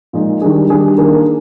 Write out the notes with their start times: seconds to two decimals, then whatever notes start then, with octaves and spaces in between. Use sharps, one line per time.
0.13 A#2 F3 G#3 D#4
0.41 D#3 G3 D4 G#4
0.70 D#3 G3 D4 G#4
0.97 D#3 A#3 D4 G#4